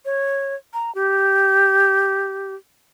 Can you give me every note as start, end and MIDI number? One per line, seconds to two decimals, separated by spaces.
0.05 0.55 73
0.74 0.93 82
0.95 2.55 67